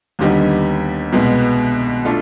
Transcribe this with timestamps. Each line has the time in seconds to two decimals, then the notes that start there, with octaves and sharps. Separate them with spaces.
0.19 D#2 D3 G3 B3 D#4
1.12 C2 B2 G#3 B3
2.05 A3 D4 F4 A4